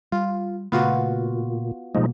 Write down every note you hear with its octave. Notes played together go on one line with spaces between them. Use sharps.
G3 F4
A#2 C#3 A3 B3 F4 F#4
B2 F3 G3 G#3 A#3 D#4